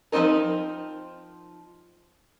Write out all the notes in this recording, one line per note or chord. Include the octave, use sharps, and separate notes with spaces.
F3 A3 C4 D#4 A#4